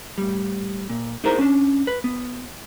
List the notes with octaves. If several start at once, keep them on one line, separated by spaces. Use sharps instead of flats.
A2 G3
A#2
D#4 E4 G#4 A#4 C5 A#5
C#4 D4
B4
B3